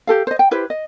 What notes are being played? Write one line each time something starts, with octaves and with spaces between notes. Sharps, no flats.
G4 A4 F5
C5 D#5
G5
E4 G4 B4 C5
D#5